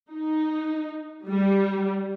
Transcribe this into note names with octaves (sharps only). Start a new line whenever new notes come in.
D#4
G3